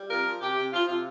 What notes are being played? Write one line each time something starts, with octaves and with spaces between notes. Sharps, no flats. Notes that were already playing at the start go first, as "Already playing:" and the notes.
Already playing: G3
C3 F4 A#4
F3
C3 G4
C3
F3 F4
C3 F4